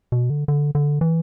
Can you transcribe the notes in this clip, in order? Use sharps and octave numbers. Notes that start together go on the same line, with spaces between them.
B2
D3
D3
D3
E3